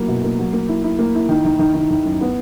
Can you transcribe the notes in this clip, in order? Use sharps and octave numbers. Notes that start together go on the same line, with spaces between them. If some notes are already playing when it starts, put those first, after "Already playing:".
Already playing: F#3 A#3 E4
B2
A#3
F#3
A#3
E4
E4
A#3
E4
D#3
D#3
D#3
D#3
D#3
F#2
B3